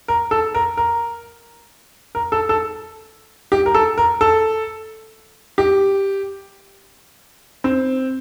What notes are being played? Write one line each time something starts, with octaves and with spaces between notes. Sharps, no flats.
A#4
A4
A#4
A#4
A#4
A4
A4
G4
A#4
A4
A#4
A4
G4
C4